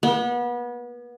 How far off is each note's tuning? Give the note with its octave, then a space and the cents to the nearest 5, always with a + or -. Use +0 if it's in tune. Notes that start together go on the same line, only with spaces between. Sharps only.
B3 -30